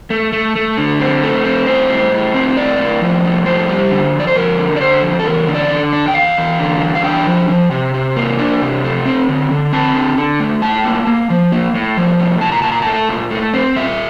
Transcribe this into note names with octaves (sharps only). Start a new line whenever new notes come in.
A3
A3
A3
D3
C4
A3
C4
A2 C5
A2
A2
C4
A2 D5
A2
F3
A2
F2 C5
G3
D3
F2
D5
C5
F2 A#4
D3
D5
D3 C5
F2
A4
E2 A#4
D3
D5
D3
D4
G5
E2 F5
E2
D3
E2
F5
D4 G5
F3
F3
C3
C3
A#3
D4
C3
A3
C4
D3
D3
C4 A5
D3
D3
A3
A2 A5
A#3
A#3
F3
A#3
A2
F3
A2
A#2 A5
A#5
A#2 A5
A#5
A3 A5
A#2
A3
C4
A#2 E5